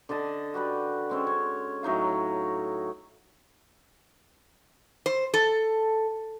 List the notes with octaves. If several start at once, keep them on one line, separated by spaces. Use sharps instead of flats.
D3 D5 D#5 A5
F#4 G4 B4 D5
G#3 C4 C#4
C#5
A2 F#3 D#4 F5
C5
A4